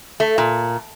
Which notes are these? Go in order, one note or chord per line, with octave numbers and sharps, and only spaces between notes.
A3
A#2